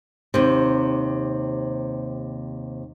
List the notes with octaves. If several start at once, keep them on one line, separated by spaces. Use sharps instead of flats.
D#2 C3